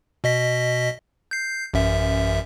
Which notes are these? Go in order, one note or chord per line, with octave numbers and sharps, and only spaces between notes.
B2 D#5 B6
G6 C7
A1 F#2 E5